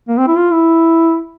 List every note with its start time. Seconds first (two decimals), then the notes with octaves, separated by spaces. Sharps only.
0.08 A#3
0.18 C4
0.28 E4
0.37 F4
0.52 E4